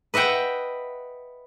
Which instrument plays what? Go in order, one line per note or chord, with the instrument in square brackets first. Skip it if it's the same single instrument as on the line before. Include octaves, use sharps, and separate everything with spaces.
[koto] B4 D#5 E5 F#5 G5